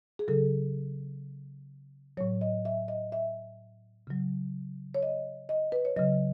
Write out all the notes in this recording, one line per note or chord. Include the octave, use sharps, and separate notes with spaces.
G#4
C#3 F#3 A4
A2 F#3 C#5
D#5
E5
D#5
E5
C#3 F#3
C#5
D#5
D#5
B4
C#5
C#3 F#3 D#5